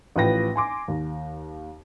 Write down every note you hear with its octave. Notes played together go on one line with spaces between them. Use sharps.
A1 A2 F3 B4 G5 A#6
G#5 C6 D6
D#2